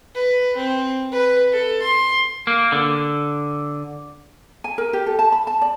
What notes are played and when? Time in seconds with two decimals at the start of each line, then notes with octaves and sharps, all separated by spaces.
0.15 B4
0.56 C4
1.12 B4
1.52 A4
1.82 C6
2.47 A#3
2.72 D3
4.64 G#5
4.78 A#4
4.93 G4
5.06 A4
5.19 A5
5.32 B5
5.47 A5
5.62 D5